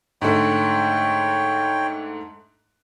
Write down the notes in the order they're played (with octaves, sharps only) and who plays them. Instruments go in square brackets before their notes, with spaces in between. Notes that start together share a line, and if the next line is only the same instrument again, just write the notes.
[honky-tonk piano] G#2 D3 A3 [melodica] C#5 G5